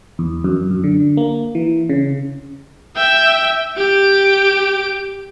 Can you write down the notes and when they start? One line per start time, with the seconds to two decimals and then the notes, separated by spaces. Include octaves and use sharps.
0.19 E2
0.44 F#2
0.71 F#2
0.84 D3
1.17 A#3
1.55 E3
1.89 C#3
2.96 E5 G5
3.77 G4 D7